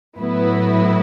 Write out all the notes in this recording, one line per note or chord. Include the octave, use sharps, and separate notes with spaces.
A2 F#3 B3 E4 B4